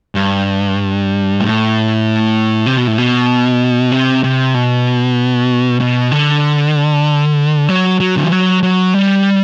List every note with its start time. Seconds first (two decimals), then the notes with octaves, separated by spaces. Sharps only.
0.15 G2
1.41 A2
2.66 C3
2.77 B2
2.87 A2
2.98 B2
3.92 C3
4.24 C3
4.55 B2
5.80 B2
6.12 D3
7.69 F#3
8.00 F#3
8.17 D3
8.25 E3
8.32 F#3
8.63 F#3
8.94 G3